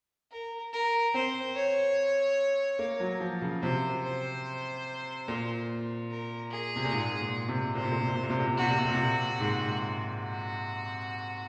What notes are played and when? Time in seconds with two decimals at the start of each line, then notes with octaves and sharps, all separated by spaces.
0.31 A#4
0.73 A#4
1.14 C4 C5
1.55 C#5
2.79 A#3
3.00 F#3
3.20 F3
3.42 C#3
3.62 C3 C5
4.03 C5
5.28 A#2
6.10 A#4
6.51 G#4
6.76 C3
6.85 A#2
6.93 G#2
7.21 A#2
7.48 C3
7.75 A#2 C5
7.84 C3
7.91 A#2
7.99 C3
8.07 A#2
8.15 C3
8.23 A#2
8.30 C3
8.39 A#2
8.47 C3
8.54 A#2
8.58 C3 F#4
8.70 A#2
8.78 C3
8.85 A#2
8.94 C3
9.01 A#2
9.40 G#2
10.24 F#4